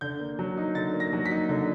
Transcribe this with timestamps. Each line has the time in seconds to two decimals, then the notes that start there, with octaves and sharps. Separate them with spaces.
0.01 D3 G6
0.20 A#3
0.39 F#3
0.57 D#4
0.75 D3 A6
0.94 A#3
1.00 A#6
1.13 F#3
1.26 B6
1.31 D#4
1.49 D3